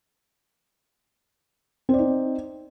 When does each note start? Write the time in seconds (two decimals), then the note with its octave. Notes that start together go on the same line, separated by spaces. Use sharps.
1.89 C4
1.94 D5
1.99 D#4